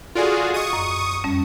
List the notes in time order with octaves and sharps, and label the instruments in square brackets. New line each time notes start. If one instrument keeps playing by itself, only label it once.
[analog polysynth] F4 F#4 G#4 [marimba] A4 D5 C6
[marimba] D#5 [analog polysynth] C#6 D#6
[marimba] F#2
F2 G3 C#4